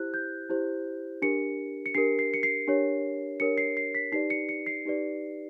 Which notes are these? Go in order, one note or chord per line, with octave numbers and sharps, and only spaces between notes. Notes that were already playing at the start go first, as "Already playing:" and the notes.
Already playing: E4 G4 C5 F#6
G6
E4 G4 C5
D4 G4 A#4 C#7
C#7
D4 G4 A#4 C7
C7
C#7
C7
D4 G4 A#4 C#5
D4 G4 A#4 C#5 C#7
C7
C7
B6
D#4 G4 B4 D5 C7
C#7
C#7
C7
D#4 G4 B4 D5